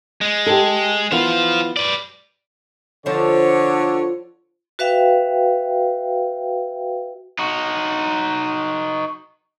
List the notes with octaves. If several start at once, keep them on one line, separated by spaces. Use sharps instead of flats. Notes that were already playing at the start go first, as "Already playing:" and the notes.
G#3
G4 A4
E3 B3 F4 C5 F5
B4 D5
D3 F3 F4 C5 C#5
F#4 B4 E5 F5 G5
D#4 F#4